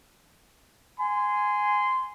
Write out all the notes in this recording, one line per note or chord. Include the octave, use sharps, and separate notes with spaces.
G#5 C6